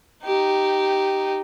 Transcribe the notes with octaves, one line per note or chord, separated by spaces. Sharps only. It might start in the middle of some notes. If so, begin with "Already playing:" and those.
D#4 G4